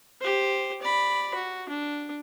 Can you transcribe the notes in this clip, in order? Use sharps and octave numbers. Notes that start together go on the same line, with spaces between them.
G4 C5
D5 B5
F#4
D4